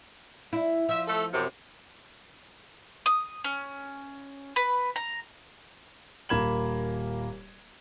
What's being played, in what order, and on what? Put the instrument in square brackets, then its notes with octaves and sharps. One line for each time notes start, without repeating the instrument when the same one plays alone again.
[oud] E4
[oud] F3 [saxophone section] E5
[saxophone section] A3 A4
F#2 C3
[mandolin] D#6
C#4
B4
A#5
[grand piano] D#1 A#3 B5 G#6 E7 F#7